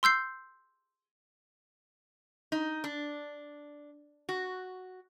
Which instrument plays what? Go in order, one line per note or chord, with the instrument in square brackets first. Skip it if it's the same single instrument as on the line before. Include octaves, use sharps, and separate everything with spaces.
[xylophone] C6 E6 G6 C7
[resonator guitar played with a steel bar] D#4
D4
F#4